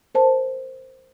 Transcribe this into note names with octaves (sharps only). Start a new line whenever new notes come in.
A#4 C5 A5